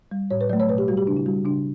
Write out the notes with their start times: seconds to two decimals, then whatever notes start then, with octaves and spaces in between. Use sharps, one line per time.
0.11 G3
0.31 A2 C#5
0.41 B4
0.49 F#3 A3 D5
0.60 C#5
0.69 B2 B4
0.78 G4
0.88 G3 F#4
0.97 G4
1.07 C#3 D4
1.17 E4
1.26 G3 F#4
1.45 C#3 D4